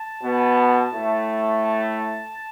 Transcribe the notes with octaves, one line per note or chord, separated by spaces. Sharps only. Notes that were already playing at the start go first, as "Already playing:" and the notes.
Already playing: A5
B2 B3
A2 A3
A5